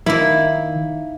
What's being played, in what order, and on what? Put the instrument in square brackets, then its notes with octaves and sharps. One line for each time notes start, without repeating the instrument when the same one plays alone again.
[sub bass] D#3 [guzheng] A#3 D#4 [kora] E4